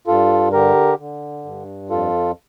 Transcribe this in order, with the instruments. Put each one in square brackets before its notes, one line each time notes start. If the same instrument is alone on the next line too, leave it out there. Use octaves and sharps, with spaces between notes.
[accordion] G2 F4 A4
D3 G4 A#4
D3
G2
F2 F4 A4